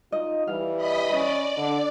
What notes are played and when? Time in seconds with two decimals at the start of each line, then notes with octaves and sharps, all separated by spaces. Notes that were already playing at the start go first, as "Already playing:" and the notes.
0.12 D#4 F4 D#5
0.47 E3 G3 F5
0.77 D#5 B5
1.13 C#4 D5 D#5
1.57 D3 D4